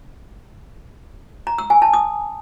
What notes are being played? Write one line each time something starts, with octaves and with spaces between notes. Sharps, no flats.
A#5
E6
G#5
A5
D#6